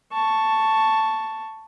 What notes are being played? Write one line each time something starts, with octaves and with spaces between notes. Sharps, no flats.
A5 C#6